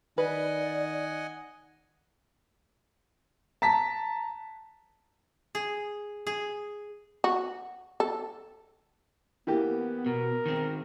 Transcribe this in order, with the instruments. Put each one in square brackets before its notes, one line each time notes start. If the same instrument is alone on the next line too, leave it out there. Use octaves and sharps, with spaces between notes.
[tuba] D#3 [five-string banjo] B4 [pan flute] D5 [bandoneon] D#5 F#5 G#5
[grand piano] A5 A#5 B6
[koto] G#4
G#4
[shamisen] F#4
A4
[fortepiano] E3 A#3 G4 [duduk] B3
[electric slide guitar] B2 [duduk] A#4
[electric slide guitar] D#3 C4